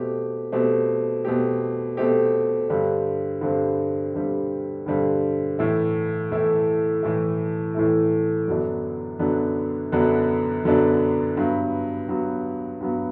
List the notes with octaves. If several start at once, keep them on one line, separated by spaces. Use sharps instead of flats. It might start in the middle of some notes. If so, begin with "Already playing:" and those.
Already playing: B2 A3 C4 G4
B2 A3 C4 G4
B2 A3 C4 G4
B2 A3 C4 G4
G2 D3 G3 C4
G2 D3 G3 C4
G2 D3 G3 C4
G2 D3 G3 C4
A2 E3 A3 E4
A2 E3 A3 E4
A2 E3 A3 E4
A2 E3 A3 E4
F#2 D3 F#3 B3 D4
F#2 D3 F#3 B3 D4
F#2 D3 F#3 B3 D4
F#2 D3 F#3 B3 D4
G2 F#3 B3
G2 F#3 B3
G2 F#3 B3